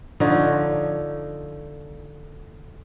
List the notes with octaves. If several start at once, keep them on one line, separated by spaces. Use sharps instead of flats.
D3 F3 D#4 C#5